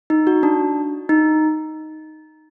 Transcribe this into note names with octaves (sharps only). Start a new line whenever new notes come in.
D#4
F#4
D4
D#4